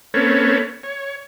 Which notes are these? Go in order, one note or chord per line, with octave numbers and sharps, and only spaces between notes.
A#3 C4 C#4 A4 B4 C#5
C#5